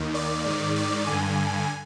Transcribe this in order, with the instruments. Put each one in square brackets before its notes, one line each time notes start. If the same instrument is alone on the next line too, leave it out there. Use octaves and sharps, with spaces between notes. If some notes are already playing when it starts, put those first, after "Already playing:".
Already playing: [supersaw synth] D#2 D#3
D5
G#2 D#3
D5
G2 D3 G#5